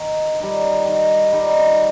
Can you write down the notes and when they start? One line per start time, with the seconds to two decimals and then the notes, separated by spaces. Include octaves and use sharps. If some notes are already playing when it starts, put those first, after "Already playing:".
Already playing: D#3
0.40 G3 D#4
0.86 D#3
1.33 G3 D#4